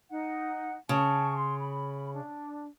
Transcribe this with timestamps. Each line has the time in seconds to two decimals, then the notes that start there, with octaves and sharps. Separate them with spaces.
0.10 D#4 F#5
0.89 C#3 A5 C#6
1.34 C6
1.58 B5
2.12 D4